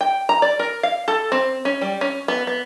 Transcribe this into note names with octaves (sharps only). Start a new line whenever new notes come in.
G5
A#5
D5
A#4
F5
A4
C4
C#4
G3
C#4
B3
B3